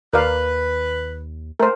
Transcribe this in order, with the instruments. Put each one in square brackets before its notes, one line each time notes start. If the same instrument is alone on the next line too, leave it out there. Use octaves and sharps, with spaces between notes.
[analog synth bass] D#2 [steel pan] A#4 D5 F5 [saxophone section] B4
[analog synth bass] A3 [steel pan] A#4 C5